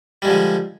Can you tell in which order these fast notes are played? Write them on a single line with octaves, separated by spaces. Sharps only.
G3 G#3 F3 D3